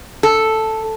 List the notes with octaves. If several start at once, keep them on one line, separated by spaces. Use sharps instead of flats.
A4